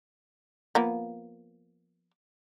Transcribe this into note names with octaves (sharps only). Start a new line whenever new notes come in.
F3 A#3 B3